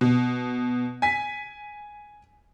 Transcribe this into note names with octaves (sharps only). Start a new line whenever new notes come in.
B2
G#5 B6